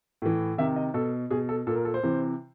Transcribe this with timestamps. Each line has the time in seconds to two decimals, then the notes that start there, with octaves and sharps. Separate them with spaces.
0.22 A2 E3
0.58 C3 D#3 E5
0.76 D#5
0.94 B2 A4
1.31 B2 G#4
1.49 A4
1.67 A#2 A4
1.76 A#4
1.85 A4
1.94 C5
2.03 C3 E3